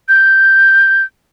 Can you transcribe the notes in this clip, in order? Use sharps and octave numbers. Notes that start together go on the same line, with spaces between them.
G6